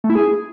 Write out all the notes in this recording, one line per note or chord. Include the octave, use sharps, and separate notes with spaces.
A3
E4
G#4